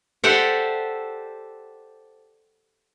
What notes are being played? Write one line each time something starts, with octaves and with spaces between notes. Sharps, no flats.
G4 A4 C5 D5 E5 F#5